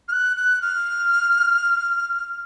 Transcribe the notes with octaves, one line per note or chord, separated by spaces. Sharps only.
F6
F#6
F#6
F6